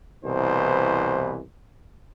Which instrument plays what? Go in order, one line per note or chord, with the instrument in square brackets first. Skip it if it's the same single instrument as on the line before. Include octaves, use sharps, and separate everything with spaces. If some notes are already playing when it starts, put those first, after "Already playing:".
[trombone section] C2 B2 E3 C5